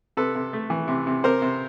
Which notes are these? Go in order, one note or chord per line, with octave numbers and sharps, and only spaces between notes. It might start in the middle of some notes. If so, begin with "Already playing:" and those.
C3 A4 B4
C3
A3
E3
C3
C3
C3 A#4 C5
C3